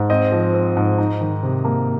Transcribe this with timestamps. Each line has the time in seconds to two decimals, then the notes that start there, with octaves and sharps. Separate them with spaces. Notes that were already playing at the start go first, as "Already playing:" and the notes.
Already playing: G#2
0.10 C4 D#5
0.32 F3
0.54 C4
0.77 G#2
0.98 D#4
1.21 D#3
1.43 C3
1.65 A#3